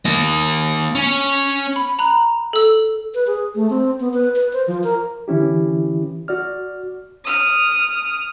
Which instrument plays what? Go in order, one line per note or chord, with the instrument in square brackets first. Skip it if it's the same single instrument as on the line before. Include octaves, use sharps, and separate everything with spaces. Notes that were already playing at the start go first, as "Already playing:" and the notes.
[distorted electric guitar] A#3 D#5
C#4
[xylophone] B5
A#5 B5 F#6
A4 E6
[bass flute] B4
G#4
A3
C4
B3
B4
B4
C5
F3
A#4
[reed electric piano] D3 E3 C#4 E4 G4
F#4 D5 F6
[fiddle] D#6 F6